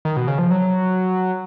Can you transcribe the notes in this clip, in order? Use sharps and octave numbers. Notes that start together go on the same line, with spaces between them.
D#3
B2
C#3
F3
F#3